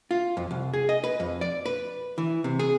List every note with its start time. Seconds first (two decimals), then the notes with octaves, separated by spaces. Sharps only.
0.11 F4
0.37 F2
0.51 C2
0.74 G#4
0.89 D#5
1.04 B4
1.20 F2
1.41 D5
1.66 B4
2.18 E3
2.44 C3
2.59 G#4